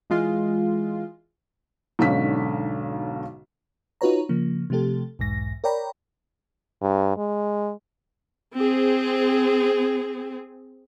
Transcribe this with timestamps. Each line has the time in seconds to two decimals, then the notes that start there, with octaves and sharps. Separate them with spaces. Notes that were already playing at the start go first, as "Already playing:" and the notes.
0.10 E3 G#3 F4
1.99 B1 G#2 D3 C#4 F5 B6
4.01 D#4 F4 F#4 B4 C#5 A#5
4.29 C#3 F3 A#3
4.70 C3 F3 A3 G4 A4
5.19 B1 E2 G#2 A#6
5.64 A#4 C#5 D5 G5 A#5 B5
6.82 G2
7.17 G#3
8.56 C4 G#4